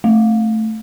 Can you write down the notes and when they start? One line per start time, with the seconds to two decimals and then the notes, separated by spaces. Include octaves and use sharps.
0.04 A3